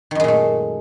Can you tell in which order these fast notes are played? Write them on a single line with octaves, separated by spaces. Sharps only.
D#3 F#2 G#3 A#2 A3